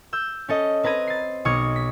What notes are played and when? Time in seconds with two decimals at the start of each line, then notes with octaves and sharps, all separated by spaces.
0.13 E6 G6
0.49 C#4 A4 D#5
0.83 C4 B4 A#5 G#6 D#7
1.07 A6 C7
1.45 B1 C#6 D#6 F6 G#6
1.76 B6